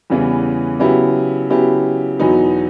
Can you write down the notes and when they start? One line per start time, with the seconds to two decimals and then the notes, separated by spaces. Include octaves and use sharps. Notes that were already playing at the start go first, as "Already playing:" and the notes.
0.10 E2 C#3 E3 G3 B3
0.79 C#3 F#3 B3 E4 G4
1.50 C#3 F#3 B3 E4 G4
2.19 E2 B2 F#3 B3 D#4